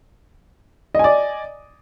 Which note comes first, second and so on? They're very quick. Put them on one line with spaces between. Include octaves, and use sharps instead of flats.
D#5 G#5 D5